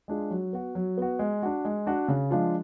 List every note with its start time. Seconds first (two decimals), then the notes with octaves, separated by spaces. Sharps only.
0.08 G#3 D4 F4 G#4
0.30 F#3
0.53 B3 F#4
0.75 F#3
0.97 B3 F#4
1.19 G#3
1.42 D4 F#4
1.65 G#3
1.87 D4 F#4
2.08 C#3
2.31 F3 G#3 D4 F4